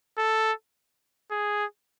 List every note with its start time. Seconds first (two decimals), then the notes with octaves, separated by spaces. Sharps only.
0.18 A4
1.31 G#4